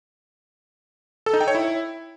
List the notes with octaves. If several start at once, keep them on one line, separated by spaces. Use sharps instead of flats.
A4
D#4
G5
C#5
E4